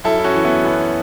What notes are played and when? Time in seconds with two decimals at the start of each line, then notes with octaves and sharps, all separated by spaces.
0.04 F#2 E4 A4
0.19 E4
0.24 C#4 F#4
0.34 E3
0.45 B3 E4
0.64 F#2 B3